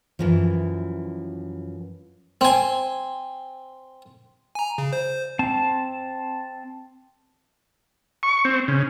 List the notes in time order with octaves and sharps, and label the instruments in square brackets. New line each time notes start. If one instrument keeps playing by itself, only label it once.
[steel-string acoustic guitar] F#2 E3 F3
[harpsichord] C4 G#5
[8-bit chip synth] G#5 A#5
C#3
C5
[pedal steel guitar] C4 A5
[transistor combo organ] C#6
C4
C#3